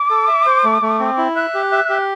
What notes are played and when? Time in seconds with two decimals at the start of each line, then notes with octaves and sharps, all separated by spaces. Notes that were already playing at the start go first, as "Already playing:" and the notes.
Already playing: D6
0.10 A4
0.28 E5
0.46 C5
0.64 A3
0.82 A3
1.00 C4
1.18 E4
1.35 E5 F#6
1.54 G4
1.72 E5
1.89 G4